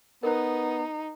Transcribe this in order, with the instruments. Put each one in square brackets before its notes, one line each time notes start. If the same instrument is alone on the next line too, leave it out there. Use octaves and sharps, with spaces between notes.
[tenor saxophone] B3 [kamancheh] D#4 [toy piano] A#4 C5